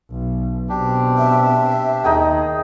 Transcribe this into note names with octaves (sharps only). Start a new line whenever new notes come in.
B1
B2 C4 D4 G4
E5
D#2 D#4 G#4 G5